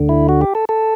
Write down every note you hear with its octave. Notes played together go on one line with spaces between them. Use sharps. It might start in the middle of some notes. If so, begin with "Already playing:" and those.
Already playing: D2 D3
E4
F#4
G4
A4
A4